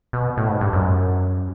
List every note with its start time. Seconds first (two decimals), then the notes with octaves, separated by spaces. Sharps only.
0.13 B2
0.37 A2
0.49 G#2
0.61 G2
0.73 F#2